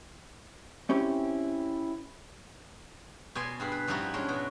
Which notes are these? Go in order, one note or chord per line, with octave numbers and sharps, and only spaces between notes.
C4 C#4 E4 G4
B2 D5 G#5 C6
G2 G#4 F5 B5
B4
G#2 F3 G3 D#4 E4 F#4
G#3 C#4 D4
B2 F#4